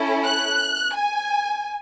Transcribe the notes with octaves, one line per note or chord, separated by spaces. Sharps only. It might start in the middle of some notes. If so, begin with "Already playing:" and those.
Already playing: C#4 E4 A4
F#6
G#5